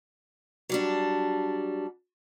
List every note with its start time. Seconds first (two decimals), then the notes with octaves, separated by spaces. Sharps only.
0.69 F#3 G3 D4